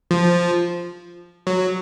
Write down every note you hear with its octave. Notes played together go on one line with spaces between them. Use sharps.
F3
F#3